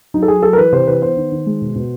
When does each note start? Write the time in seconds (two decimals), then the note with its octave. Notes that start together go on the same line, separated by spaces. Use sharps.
0.14 F#3 D#4
0.23 A4
0.28 F#3 G#4
0.43 F#3 A4
0.53 A#4
0.58 E3 B4
0.72 C3 C5
0.87 E3 B4
1.02 B3 C5
1.17 D#3
1.32 D#3
1.46 G#3
1.61 B2
1.76 B2